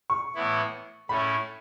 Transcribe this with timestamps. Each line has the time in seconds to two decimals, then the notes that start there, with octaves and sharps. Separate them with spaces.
0.10 C#6
0.35 A2 E3 B3 E4
1.09 A2 A3 C#4 E4 B5